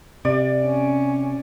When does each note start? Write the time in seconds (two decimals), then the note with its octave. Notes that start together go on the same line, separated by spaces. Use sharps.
0.25 C3 D5
0.64 C#4